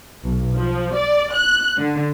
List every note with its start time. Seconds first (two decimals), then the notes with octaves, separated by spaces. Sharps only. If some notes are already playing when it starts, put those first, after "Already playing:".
0.23 B1
0.56 F3
0.96 D5
1.35 F#6
1.78 D3